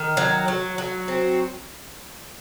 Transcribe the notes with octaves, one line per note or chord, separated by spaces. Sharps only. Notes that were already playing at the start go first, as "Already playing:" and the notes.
Already playing: D#3
F#3
F#3
F#3
C4